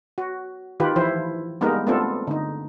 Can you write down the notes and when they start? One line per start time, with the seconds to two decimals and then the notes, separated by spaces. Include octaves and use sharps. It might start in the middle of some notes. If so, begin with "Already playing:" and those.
0.18 F#4
0.80 D#3 F4 G4 B4
0.96 E3 F3 E4 C5
1.61 G3 G#3 A#3 B3 D#4 A#4
1.87 A3 B3 C4 D4 F4 A4
2.27 D3 D#4